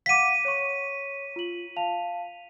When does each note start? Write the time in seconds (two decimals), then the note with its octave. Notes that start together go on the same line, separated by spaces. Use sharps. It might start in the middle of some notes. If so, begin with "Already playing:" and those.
0.06 F5 F#5 D6 B6 D#7
0.45 C#5 C#6
1.36 F4 F#7
1.76 F5 A5 F7